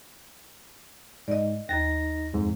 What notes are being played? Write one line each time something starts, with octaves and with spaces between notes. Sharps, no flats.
G#2 D5 D#5
D#2 D#4 A6 A#6
F2 G#2